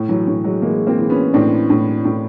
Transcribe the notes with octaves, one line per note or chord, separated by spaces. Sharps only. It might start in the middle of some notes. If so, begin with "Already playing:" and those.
Already playing: A2
E3 F#3
A2
F#3 G#3
E3 G#3 A#3
A#3 C4
E3
B3 C#4
A2 C4 D4
A2
A2